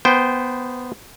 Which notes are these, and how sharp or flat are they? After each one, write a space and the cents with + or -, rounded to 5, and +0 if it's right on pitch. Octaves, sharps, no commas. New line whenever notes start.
B3 +0 C5 -15 G5 +5